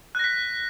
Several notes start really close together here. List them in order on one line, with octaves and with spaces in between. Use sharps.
F#6 A#6 B6